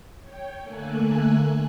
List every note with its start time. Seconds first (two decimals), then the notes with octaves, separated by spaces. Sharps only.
0.20 C#5 G5
0.60 D3 A3 A#3 A4 G#5 F#6